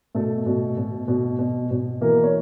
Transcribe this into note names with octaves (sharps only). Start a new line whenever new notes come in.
B2 A3 A4
B2
B2
B2
B2
B2
E3 A#3 A#4
C#5